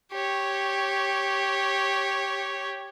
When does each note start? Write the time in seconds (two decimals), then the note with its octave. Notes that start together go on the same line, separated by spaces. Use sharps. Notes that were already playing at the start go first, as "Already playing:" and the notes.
0.12 G4 C#5